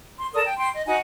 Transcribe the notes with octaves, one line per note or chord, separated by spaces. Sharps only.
C6
A4 A#4 D5 D#6
G5
G5 C6
D#5
D#4 F#4 F#5 G#5